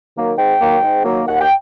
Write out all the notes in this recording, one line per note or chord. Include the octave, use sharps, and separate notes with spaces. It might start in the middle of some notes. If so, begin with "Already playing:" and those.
D#3 F#3 A#3
G#2 G5
D#3 F#3 A#3
G#2
D#3 F#3 A#3
D#2 F#5
G5